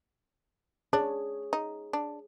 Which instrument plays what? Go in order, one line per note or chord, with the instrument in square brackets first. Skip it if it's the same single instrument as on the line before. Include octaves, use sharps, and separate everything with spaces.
[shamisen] D4 [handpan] G#4 C#5
[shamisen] D#4
D4